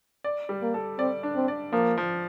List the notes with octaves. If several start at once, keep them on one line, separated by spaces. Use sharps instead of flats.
D5
G3
A#3
A4
C4 D5
D4
C4
D5
F3 A#3
F3